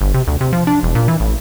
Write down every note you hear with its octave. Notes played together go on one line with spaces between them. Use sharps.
G1
C3
D2
C3
F3
D4
E1
A#2
E3
A1